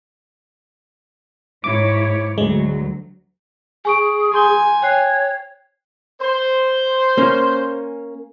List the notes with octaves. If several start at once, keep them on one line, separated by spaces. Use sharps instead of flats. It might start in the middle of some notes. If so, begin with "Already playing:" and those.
G#2 E4 C#5 D6
D2 F#3 G#3
G#4 G#5 C#6 D7
G#5 C6 G6 G7
C#5 G5 F#6 C7
C5
A#3 C#4